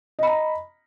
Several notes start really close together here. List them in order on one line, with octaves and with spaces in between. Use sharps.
D#5 B5 A#5